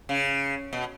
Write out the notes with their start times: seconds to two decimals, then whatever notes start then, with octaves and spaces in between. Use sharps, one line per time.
0.09 C#3
0.73 B2